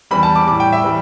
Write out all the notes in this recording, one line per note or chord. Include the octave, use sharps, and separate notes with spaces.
E2 E3 G3 B5
A5
D6
A2 G3 D6
G5
E5
A2 E3 G3